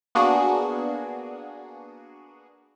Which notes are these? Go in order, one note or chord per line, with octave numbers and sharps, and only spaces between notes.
A#3 B3 D4 F#4 G#4